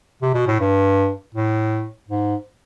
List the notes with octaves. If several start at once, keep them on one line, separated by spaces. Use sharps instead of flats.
C3
B2
A2
G2
A2
G#2